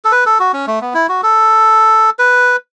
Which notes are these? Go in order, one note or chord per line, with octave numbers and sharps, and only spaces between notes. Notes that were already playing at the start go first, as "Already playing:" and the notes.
A4
B4
A4
F#4
C#4
A3
B3
E4
F#4
A4
B4